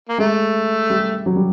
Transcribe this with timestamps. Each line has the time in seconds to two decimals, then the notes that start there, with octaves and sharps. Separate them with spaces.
0.09 A#3
0.18 G#3 A3
0.90 G3
1.26 F#3
1.36 G3